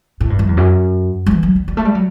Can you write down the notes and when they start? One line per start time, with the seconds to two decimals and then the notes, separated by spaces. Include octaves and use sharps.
0.21 A2
0.30 G2
0.39 F#2
0.48 E2
0.57 F#2
1.26 F#3
1.31 E3
1.43 F#3
1.56 G3
1.68 G3
1.77 A3
1.85 G3
1.95 F#3